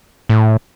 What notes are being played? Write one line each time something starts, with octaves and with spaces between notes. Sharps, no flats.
A2